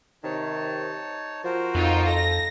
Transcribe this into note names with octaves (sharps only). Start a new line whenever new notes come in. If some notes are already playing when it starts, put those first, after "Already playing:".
C3 D#3 D#4 C#5 A5
F3 F#4 A#4 C5
F2 D#4 F4 G5
A4 A#6